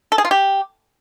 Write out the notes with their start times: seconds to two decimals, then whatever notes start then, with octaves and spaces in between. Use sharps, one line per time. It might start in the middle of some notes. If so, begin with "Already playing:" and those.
0.12 A4
0.18 G#4
0.25 F4
0.31 G4